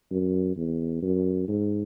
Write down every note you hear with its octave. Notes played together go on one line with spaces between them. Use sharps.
F#2
E2
F#2
G#2